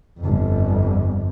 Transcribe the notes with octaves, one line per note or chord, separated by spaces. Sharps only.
G1 F2